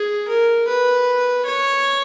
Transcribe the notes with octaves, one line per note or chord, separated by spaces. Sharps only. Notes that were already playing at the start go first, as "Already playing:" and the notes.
Already playing: G#4
A#4
B4
C#5